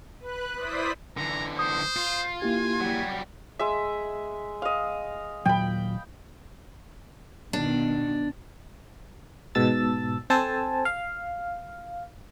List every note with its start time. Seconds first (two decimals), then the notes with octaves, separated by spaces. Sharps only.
0.20 B4 F#6
0.55 E4 C5 D5 D#6 B6
1.17 D3 E3 A#5
1.59 C5 D#6
1.96 F4
2.42 A#3 E4 G4 G#5
2.81 F#3 G3
3.59 G#3 E5
4.62 D#5 F5
5.45 D#1 A#2 F#3 G5 B5
7.53 B2 D#3 D4
9.55 G#2 B2 A5 E6 A6
10.30 C4 A4 C5 G#5 A5
10.85 F5